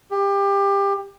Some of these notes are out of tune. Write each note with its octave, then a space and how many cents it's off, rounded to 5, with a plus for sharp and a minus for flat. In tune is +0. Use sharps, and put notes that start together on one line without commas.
G4 +25